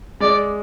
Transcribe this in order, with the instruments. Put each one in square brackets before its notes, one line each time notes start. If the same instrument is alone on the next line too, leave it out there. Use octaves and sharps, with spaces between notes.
[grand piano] G#3 [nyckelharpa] D5